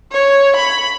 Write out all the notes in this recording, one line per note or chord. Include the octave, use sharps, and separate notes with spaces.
C#5
B5